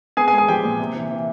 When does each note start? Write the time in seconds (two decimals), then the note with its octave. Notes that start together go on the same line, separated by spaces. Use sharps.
0.17 B3 G#4 G#5
0.28 G#4 G#5
0.33 G#3
0.38 G#4 G#5
0.48 F3 G4 G5
0.64 A#2
0.79 C3
0.95 E3
1.11 E3